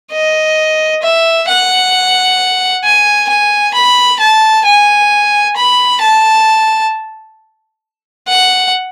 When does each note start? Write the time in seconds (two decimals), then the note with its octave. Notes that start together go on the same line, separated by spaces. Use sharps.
0.12 D#5
1.03 E5
1.48 F#5
2.84 G#5
3.29 G#5
3.74 B5
4.20 A5
4.66 G#5
5.57 B5
6.02 A5
8.29 F#5